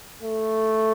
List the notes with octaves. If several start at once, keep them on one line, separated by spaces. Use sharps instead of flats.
A3